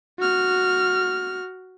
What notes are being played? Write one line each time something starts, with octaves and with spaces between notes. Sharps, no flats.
F#4 F6